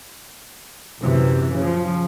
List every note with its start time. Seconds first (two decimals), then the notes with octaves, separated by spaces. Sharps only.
1.00 A#1 F#2 C3 E3
1.57 C#3 F3